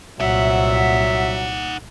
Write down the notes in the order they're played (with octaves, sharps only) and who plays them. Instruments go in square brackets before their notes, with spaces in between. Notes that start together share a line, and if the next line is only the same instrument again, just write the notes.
[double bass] C2 A#2 [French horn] F#3 [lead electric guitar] D#4 F#5 [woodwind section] E5